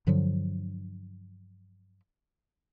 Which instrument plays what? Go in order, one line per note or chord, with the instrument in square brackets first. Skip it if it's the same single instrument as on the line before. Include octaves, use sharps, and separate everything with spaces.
[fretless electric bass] G2 D3 F3 F#3